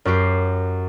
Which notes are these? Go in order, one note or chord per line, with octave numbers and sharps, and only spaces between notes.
F#2 F#4 G4 C7